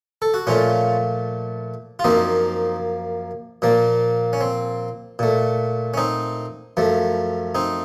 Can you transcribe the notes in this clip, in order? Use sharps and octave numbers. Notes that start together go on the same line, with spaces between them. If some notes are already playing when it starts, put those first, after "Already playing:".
A4
F#4
A#2 F3 A3 C#4 F4
F4
F#2 F3 A#3 C4 D#4
A#2 F3 A#3
C#4
C4
A#2 A3
C#4
C4 D#4
F#2 F3 A3
C4 D#4